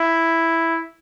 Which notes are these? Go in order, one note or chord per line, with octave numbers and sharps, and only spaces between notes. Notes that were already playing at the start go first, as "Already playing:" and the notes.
Already playing: E4